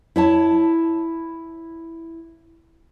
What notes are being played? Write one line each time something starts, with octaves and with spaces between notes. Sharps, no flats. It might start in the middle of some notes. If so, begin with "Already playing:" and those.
E4 C#5 A5